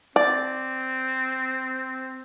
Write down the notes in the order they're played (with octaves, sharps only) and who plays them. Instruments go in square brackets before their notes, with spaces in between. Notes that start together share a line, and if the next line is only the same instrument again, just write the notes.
[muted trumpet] C4 [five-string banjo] D5